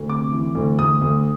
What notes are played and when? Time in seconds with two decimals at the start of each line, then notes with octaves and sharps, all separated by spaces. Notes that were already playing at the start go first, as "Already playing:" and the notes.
Already playing: D2
0.09 C3 D6
0.32 E3
0.55 D2
0.79 D2 D#6
1.02 D2